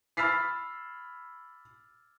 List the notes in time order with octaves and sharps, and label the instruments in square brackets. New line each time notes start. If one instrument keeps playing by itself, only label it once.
[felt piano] B5 E6 F6 A6 B6 C7